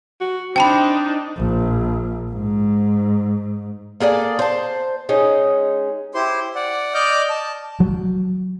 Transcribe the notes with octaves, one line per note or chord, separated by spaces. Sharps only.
F#4
C4 D4 D#4 G5 A5 B5
A#1
G#2
A#3 G#4 A4 D5
C5 A5
G#3 C#4 D#4
E4 G4 C5 C6
D5 F#5
D5 D#5 D6 F6 G6
A5
F#3